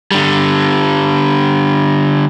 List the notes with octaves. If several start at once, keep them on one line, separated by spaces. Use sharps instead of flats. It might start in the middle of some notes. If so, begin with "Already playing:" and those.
D3 G3